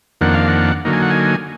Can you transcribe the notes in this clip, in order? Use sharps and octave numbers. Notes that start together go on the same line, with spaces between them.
F2 D#3 A#3 D4 F#5
F5
F#5
D3 F#3 A#3 D#4
G#5
F#5
G#5